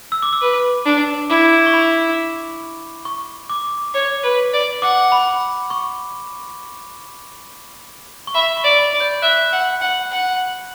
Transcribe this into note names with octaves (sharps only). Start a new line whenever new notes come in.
E6
D6
E6
B4
D4
E4 D6
C#6
B5
C#6
D6
C#5
B4
D5
F#5 D6
B5
C#6
C#6
E5 B5
C#6
D5
B5
D5
G6
E5 F#6
F#5
F#5
F#5